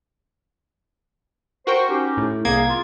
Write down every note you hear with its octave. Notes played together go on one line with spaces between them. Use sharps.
F#4 A#4 C5 G5 C#6
C#4 D#4 G4
A2
C2 A#3 G#4 G#6
F4